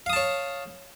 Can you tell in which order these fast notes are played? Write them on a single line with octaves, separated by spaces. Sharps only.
F5 D#6 A5 C#5